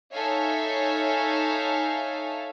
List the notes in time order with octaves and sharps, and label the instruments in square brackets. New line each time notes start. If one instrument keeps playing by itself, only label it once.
[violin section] D#4 A4 C#5 E5 F5 G#5